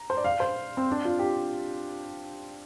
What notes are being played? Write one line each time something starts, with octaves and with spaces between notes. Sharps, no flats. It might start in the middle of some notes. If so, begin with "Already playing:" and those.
Already playing: A#5
C5
D5
F5
C5
C4
D4
F4
G4